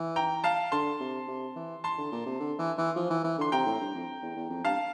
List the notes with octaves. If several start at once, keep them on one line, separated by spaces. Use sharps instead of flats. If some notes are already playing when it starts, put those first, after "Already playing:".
Already playing: E3
G5 A#5
F5 A5
D3 A5 C6
C3
C3
E3
A5 C6
D3
A#2
C3
D3
E3
E3
F3
E3
E3
D3 C6
C3 G5 A#5
A2
G2
F2
E2
E2
F2
G2 F5 A5